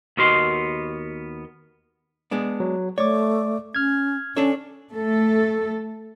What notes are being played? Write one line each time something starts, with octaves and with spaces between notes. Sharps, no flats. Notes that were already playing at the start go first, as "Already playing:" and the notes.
D#2 B3 F#4 A#4 D#5 C6
G#3 B3 D4
F#3
A3 C#5 D5 D6
C#4 F6 G#6
C#4 D4 A4 C#5
A3 A4